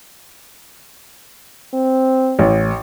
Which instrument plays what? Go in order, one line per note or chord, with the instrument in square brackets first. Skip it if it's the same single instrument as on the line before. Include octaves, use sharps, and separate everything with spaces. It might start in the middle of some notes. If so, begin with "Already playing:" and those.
[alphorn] C4
[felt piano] A1